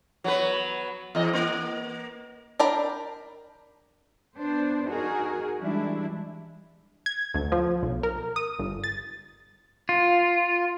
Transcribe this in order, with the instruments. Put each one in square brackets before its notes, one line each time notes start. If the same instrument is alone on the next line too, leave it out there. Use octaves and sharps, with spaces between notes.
[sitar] F#3 B3 B4
E2 D#5
A#3
[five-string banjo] D4 A#4 G5 B5
[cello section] B3 D4 C5
D#4 F#4 G#4 A#4
E3 G3 G#3 D4 E4
[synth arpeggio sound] G#6
D2
F3
B1
A#4
D#6
G1
A6
[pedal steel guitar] F4